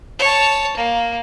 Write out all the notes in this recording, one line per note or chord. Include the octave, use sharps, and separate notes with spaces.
C#5 A5
A#3